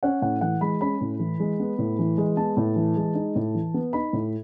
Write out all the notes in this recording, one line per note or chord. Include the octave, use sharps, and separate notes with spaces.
C#4 F#5
A2 F#5
E3 F#5
G#3 B5
C#4 B5
A2
E3
G#3
B3
A2
E3
G#3
B3 A5
A2
E3
G#3
D#4
A2
E3
B3
D#4 B5
A2